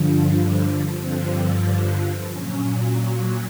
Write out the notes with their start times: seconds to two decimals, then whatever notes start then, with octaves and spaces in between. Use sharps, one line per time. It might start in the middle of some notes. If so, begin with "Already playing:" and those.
Already playing: G2 D3 F3
0.95 G2 D3 F3 C4
2.29 A#2 F#3 C#4